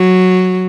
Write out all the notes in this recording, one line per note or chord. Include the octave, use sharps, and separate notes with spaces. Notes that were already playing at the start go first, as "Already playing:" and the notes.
Already playing: F#3